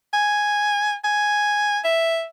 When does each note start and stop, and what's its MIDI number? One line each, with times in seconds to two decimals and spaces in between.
0.14 0.95 80
1.04 1.79 80
1.84 2.25 76